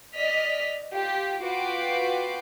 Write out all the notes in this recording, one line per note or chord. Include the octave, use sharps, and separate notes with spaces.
D5 D#5 F6 B6
F4 G4
F4 F#4 B4 G5 D6 C7